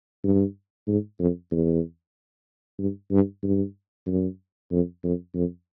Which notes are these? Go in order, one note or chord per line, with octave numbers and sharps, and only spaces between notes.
G2
G#2
F2
E2
G2
G2
G2
F#2
F2
F2
F2